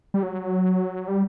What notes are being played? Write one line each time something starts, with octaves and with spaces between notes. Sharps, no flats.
G3
F#3
G3